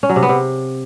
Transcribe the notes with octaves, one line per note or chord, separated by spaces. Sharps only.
C#4
F#3
C3
B3
C3